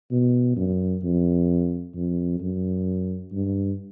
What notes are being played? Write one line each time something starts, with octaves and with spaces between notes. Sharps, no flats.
B2
F#2
F2
F2
F#2
G2